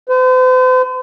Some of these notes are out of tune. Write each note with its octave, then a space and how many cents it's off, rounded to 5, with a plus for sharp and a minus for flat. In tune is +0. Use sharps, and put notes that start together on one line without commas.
C5 -45